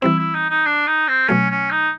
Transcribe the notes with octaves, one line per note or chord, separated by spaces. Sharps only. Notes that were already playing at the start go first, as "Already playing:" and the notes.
E3 G3 C4 E4
E4
D#4
D#4
D4
D#4
C4
B2 F#3 A3 C#4
C#4
D#4